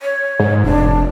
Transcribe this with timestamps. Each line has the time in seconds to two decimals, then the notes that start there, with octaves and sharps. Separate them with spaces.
0.01 C#5
0.40 G#2
0.64 F1 D4